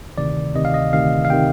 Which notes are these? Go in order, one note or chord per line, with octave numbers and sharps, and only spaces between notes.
D2 C3 D#3 D5
D2 C3 D#3 D#5
F5
D#5
D2 C3 D#3 F5
F5
C3 D#3 G5